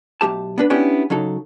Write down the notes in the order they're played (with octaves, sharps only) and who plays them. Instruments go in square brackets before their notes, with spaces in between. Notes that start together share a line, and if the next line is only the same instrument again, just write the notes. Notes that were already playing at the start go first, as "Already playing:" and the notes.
[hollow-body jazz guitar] B1 G2 A3 G4 A5
B3 D4 B4
B3 C#4 D4 E4 G4
C#3 F#3 D#4 A4